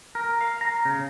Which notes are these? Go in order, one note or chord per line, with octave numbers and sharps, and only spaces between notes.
A#4
F5
A#5
C#3